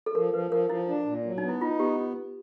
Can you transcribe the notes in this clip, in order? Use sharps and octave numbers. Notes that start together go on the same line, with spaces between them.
A4
F3 A#4
F3 B4
F3 A#4
F3 E4
D4
A#2
F#3
D#4
B3
E4
D#4 F4
B3 G4